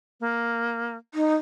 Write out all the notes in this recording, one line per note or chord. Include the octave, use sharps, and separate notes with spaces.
A#3
D#4